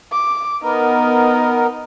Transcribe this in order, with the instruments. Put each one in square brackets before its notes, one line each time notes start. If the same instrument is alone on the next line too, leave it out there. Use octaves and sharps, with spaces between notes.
[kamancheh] D6
[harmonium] B3 A#4 [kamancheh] D#4